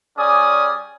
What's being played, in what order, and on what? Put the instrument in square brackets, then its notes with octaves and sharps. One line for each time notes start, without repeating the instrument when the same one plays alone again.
[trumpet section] G3 C#4 G#4 D5 G#5 D#6